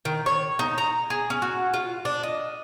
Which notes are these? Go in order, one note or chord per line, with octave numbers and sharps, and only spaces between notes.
D#3
C#5
D#4
A#5
G#4
C#4
F#4
F4
D4
D#5